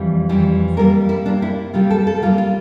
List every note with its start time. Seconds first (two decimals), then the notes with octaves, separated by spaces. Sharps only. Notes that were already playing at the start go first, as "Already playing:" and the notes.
Already playing: F2 E3 G3
0.29 F2 E3 G3
0.77 C3 G3 A#3 A#4
1.09 E4
1.26 C3 G3 A#3 D4
1.42 E4
1.74 C3 G3 A#3 F4
1.90 A4
2.07 A4
2.22 C3 G3 A#3 F4
2.38 F4